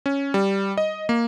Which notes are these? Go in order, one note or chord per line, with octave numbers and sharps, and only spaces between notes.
C#4
G3
D#5
A#3